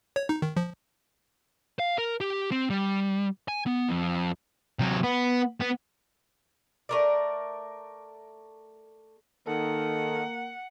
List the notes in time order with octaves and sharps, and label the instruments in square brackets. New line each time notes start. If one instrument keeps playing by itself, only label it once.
[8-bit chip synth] C#5
D#4
D#3
F3
[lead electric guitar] F5
A#4
G4
C4
G3
G#5
B3
F2
[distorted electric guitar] C3 F#3
B3
B3
[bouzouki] A3 A#4 D5
[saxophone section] D#3 [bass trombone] A#3 [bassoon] A4 [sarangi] F#5